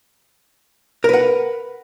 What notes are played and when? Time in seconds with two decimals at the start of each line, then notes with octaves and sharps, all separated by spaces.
1.04 A#4
1.09 B4
1.13 F#5